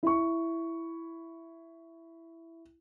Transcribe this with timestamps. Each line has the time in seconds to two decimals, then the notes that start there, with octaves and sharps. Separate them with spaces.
0.03 E4 C#6